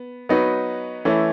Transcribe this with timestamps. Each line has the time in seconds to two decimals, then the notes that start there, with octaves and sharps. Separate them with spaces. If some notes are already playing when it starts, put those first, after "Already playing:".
Already playing: B3
0.29 F#3 B3 D#4 F#4 B4
1.05 E3 A3 C#4 E4